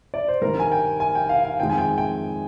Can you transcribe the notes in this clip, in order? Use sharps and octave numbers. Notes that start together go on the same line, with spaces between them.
D5
C5
G2 D#3 G3 A#4
G#5
G5
G#5
G5
F5
F5
F2 D#3 G#3 G5
G#5
G5
G5